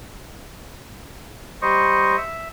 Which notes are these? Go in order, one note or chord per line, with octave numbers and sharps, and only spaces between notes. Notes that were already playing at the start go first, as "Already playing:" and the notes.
G3 C5 D#5 C#6
E5